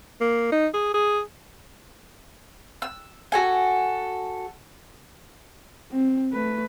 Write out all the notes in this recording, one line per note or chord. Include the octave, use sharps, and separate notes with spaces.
A#3
D#4
G#4
G#4
E6
F#4 A4 G#5
C4
A3 B4